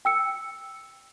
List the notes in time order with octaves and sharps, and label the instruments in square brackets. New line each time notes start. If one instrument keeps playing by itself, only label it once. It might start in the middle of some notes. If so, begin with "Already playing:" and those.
[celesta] G5 E6 C#7